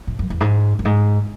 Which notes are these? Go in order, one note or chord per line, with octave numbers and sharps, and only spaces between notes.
A2
F#2
E2
G#2
F#2
G#2